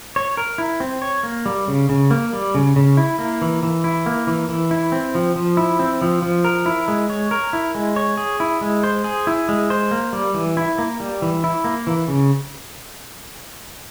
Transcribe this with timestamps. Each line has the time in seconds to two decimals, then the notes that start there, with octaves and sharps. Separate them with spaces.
0.16 C#5
0.37 A#4
0.58 E4
0.80 C4
1.02 C#5
1.23 A#3
1.46 G3
1.68 C#3
1.89 C#3
2.11 A#3
2.33 G3
2.55 C#3
2.76 C#3
2.97 E4
3.19 A#3
3.41 E3
3.63 E3
3.84 E4
4.06 A#3
4.27 E3
4.49 E3
4.71 E4
4.92 C4
5.15 F3
5.36 F3
5.57 E4
5.79 C4
6.01 F3
6.22 F3
6.44 A#4
6.66 E4
6.88 G#3
7.10 C#5
7.31 A#4
7.53 E4
7.75 G#3
7.96 C#5
8.17 G#4
8.40 E4
8.61 G#3
8.84 C5
9.04 G#4
9.27 E4
9.49 G#3
9.70 C5
9.91 A#3
10.13 G3
10.34 E3
10.57 E4
10.78 A#3
11.00 G3
11.22 E3
11.44 E4
11.64 A#3
11.87 E3
12.08 C#3